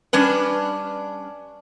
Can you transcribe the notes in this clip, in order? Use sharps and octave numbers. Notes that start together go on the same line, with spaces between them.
G3 C#4 D4 B4